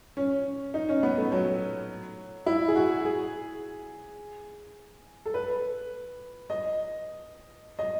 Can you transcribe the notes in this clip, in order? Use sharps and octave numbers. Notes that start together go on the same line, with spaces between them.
C#4
D#4
C#4
B3
A3
F#3
E4
G#4
F#4
G#4
A4
B4
D#5
D#5